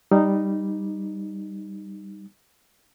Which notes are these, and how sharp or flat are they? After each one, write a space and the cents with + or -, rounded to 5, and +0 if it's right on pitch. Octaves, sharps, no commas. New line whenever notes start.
G3 +0 D#4 -10